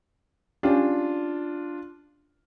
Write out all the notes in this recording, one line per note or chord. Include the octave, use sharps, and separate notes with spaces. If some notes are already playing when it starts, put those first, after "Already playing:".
C#4 D4 F4 G4